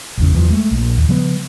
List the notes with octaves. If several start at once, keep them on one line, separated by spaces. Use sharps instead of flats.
G#1 E2 C#3
E2 E3 F3
G#3 A3
A#1 A#2
D#2
C#3 F3 G3 B3